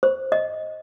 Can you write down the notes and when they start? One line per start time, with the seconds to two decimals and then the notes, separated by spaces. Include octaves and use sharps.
0.03 C5
0.32 D#5